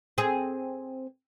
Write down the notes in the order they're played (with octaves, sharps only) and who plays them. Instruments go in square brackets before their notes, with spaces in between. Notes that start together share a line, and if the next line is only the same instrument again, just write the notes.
[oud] C4 G#4